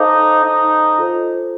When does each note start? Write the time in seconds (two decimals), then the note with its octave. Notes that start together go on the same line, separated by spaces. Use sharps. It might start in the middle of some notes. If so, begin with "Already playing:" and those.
Already playing: D#4 A4 C5 F5 A5 D6
0.45 D#4
0.98 F4 A4 C5